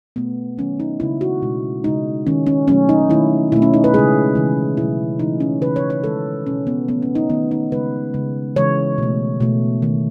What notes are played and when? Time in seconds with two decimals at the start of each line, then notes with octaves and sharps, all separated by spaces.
0.16 B2 A3 B3
0.58 D#3 F#3 A3 C#4
0.80 D#4
1.00 C#3 G#3 E4
1.21 F#4
1.42 B2 G#3
1.84 C#3 G#3 D#4
2.27 D#3 G#3 C#4
2.47 C#4
2.68 B2 F#3 A3 C#4
2.89 D#4
3.10 D#3 A3 E4
3.52 B2 A3 E4
3.62 C#4
3.74 D#4
3.84 B4
3.94 C#3 G#3 G#4
4.35 C#3 E3 G#3
4.77 B2 F#3 A3 E4
5.20 C#3 E3 A3 D#4
5.40 C#4
5.62 C#3 E3 G#3 B4
5.76 C#5
5.90 C#5
6.04 D#3 G#3 A4
6.46 B2 G#3 C#4
6.67 B3
6.88 D#3 F#3 A3 B3
7.02 C#4
7.15 D#4
7.29 D#3 A3 B3
7.51 D#4
7.72 C#3 G#3 B4
8.14 C#3 G#3
8.56 C#3 E3 G#3 C#5
8.98 B2 A3
9.40 B2 A3
9.82 D#3 A3